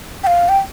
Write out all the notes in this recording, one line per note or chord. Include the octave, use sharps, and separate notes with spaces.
G5
F5
G5